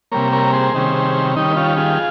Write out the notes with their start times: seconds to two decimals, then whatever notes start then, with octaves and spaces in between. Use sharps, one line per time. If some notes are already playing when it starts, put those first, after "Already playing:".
0.12 C3 G3 A#3 A#4 C#5
0.32 A#4 C#5
0.53 G#4 C5
0.74 C3 D#3 G3 C#4
1.36 D#3 G3 C#4 D#4
1.56 C#4 F4
1.77 F4 G#4